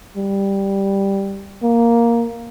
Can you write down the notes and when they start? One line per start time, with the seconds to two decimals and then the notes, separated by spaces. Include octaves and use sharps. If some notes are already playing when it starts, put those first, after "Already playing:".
0.17 G3
1.63 A#3